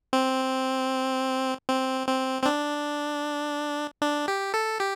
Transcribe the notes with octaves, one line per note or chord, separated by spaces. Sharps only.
C4
C4
C4
C4
D4
D4
G4
A4
G4